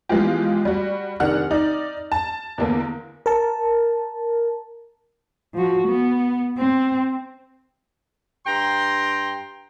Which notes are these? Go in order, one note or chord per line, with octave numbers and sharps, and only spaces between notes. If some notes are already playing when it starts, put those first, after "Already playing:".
E3 F3 G#3 B3 F4 G4
G3 F#4
F1 D#3 D4 F#5 F6
D#4 D5
A5
E2 D3 A#3 B3
A#4 A5
F3 F#4
B3
C4
G2 G5 A#5 C6